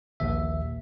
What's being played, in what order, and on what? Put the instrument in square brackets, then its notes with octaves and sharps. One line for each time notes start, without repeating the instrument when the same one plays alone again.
[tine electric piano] A#1 D#2 E5